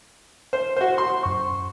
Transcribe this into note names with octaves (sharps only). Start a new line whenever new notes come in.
C5
F#4 C5
C6
F#2 C#6